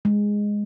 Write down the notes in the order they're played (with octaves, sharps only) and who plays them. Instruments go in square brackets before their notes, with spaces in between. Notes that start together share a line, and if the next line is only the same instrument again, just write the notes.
[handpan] G#3